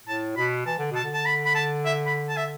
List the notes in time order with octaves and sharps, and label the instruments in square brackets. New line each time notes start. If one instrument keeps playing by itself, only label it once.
[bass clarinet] A2 [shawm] A5
[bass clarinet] B2 [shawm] B5
[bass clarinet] E3 [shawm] A5
[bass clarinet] D3
[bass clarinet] B2 [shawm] A5
[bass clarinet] D3
[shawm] A5
B5
B5
A5
E5
B5
A5
E5